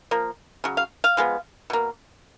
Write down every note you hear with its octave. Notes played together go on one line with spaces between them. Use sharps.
F3 A#3
C#3 F#3
F5
F5
F3 G#3 B3
B2 A#3